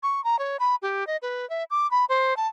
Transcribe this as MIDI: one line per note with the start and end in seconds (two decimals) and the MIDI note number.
0.03 0.23 85
0.24 0.39 82
0.39 0.57 73
0.59 0.75 83
0.82 1.06 67
1.07 1.17 75
1.22 1.48 71
1.50 1.64 76
1.71 1.89 86
1.91 2.05 83
2.09 2.36 72
2.37 2.47 81